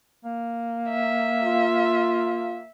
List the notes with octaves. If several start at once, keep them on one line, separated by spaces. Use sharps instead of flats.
A#3
E5
F4